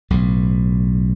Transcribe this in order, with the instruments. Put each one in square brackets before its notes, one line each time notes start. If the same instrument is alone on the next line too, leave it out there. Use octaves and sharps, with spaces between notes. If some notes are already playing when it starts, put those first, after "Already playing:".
[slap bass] B1 A2